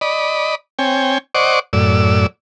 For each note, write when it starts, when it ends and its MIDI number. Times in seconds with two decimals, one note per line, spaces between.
0.01 0.55 74
0.01 0.55 75
0.01 0.55 83
0.79 1.18 60
0.79 1.18 73
0.79 1.18 79
0.79 1.18 80
1.35 1.59 72
1.35 1.59 74
1.35 1.59 75
1.35 1.59 78
1.35 1.59 85
1.35 1.59 86
1.73 2.27 42
1.73 2.27 45
1.73 2.27 74
1.73 2.27 88